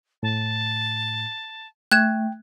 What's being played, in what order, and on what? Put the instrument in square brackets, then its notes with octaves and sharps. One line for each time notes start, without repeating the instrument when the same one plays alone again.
[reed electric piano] A2 [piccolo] A5
[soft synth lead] A3 [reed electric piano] G5 [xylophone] F#6 G#6 E7